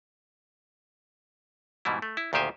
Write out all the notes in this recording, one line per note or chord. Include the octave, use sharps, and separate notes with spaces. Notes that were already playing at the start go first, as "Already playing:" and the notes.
G#2 B2 E3 G3 E4
A3
E4
D2 A#2 D#3 G4 C5 G#5